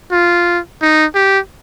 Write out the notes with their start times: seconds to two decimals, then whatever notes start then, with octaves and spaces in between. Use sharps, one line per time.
0.12 F4
0.81 D#4
1.15 G4